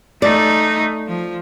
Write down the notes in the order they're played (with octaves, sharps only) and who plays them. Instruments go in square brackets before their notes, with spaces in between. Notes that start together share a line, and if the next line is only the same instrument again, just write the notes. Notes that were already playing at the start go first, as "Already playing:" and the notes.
[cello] A3 D#4 [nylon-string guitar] D5
[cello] F3